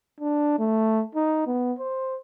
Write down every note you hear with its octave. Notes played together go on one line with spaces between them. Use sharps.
D4
A3
D#4
B3
C5